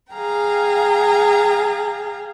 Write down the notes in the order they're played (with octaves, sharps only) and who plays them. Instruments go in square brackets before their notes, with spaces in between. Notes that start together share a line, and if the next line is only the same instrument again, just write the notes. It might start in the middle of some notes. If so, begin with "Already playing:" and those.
[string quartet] G#4 F5 G5 A#5